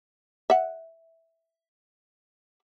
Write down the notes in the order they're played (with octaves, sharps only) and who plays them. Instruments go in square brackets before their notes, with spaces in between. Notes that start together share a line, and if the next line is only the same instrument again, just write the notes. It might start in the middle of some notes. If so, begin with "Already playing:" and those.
[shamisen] E5 F#5